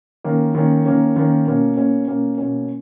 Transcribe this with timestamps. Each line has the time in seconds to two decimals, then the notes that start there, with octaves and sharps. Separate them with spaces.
0.24 D#3 A#3 C#4
0.55 D#3 A#3 C#4
0.86 D#3 A#3 C#4
1.16 D#3 A#3 C#4
1.46 B2 A#3 C#4
1.76 B2 A#3 C#4
2.07 B2 A#3 C#4
2.38 B2 A#3 C#4